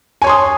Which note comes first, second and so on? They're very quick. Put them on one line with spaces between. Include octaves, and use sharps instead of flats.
G#5 C#5 C6 D#6